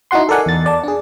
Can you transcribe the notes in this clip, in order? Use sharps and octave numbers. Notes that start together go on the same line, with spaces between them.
D#4 E4 F#4 F#5 C6
A4 A#4 D5 F#5 G#5
E2 A6
D5 A5
D4 G#4